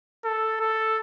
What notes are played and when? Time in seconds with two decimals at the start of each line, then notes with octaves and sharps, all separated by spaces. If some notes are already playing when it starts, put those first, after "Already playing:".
0.25 A4
0.61 A4